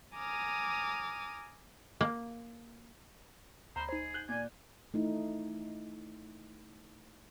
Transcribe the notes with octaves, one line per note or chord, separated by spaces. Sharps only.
G#5 A#5 D6 D#6 F6
A#3
D2 C5 A#5 B5
D#4 G#4 C5
F#6 G6 F#7
A#2 D5 G#5
A3 D#4 E4